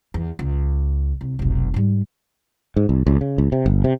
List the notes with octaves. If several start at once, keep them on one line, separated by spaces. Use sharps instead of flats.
E2
C#2
C2
F1 B1
G#2 G3
G#2
C2
C#2
C#3
C#2
C3
G1
C3